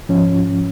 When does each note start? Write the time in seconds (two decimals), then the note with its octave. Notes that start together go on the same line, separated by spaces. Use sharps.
0.09 G#2 F3 C#4